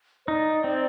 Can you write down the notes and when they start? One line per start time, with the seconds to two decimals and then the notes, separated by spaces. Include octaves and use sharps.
0.24 C5
0.28 D#4 D5
0.64 C4